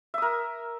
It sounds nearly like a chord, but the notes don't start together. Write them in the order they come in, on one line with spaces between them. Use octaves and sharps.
E5 D#6 A#4